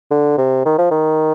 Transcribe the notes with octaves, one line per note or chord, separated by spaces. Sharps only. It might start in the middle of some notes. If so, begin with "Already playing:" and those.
D3
C3
D#3
F3
D#3